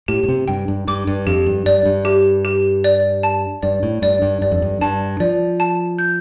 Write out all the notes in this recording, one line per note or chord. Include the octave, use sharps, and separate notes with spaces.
A2 G4
A2
C3
G2 G5
G2
G2 D6
G2
F2 G4
G2
G2 D5
G2
G4
G4
D5
A5
G2 D5
A2
G2 D5
G2
G2 D5
F2
G2
G2 A5
F3 D5
A5
G6